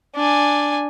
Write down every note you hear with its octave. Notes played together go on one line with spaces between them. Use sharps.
D4 G#5